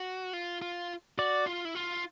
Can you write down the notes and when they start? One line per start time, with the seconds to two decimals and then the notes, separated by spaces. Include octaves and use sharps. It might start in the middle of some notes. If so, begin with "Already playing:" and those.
Already playing: F#4
0.33 F4
0.62 F4
1.18 F#4 D5
1.47 F4
1.65 E4
1.75 F4